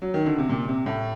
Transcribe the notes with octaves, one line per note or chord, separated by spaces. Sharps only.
F#3
D#3
D3
C3
A#2
C3
A2